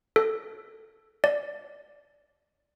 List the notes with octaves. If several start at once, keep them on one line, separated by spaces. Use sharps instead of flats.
A4
D5